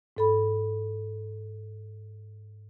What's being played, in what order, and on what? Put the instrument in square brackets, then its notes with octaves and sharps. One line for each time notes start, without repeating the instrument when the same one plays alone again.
[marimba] G#2 A4 B5